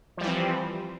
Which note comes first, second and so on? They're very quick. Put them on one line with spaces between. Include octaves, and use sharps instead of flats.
F3 G3 E3 C4